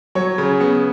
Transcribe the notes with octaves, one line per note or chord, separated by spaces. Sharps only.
F#3 C#5
C#3
B3